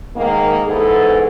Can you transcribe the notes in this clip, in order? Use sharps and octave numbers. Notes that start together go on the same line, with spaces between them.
G#2 D#3 A#3
E2 G#2 B3 G#4 A4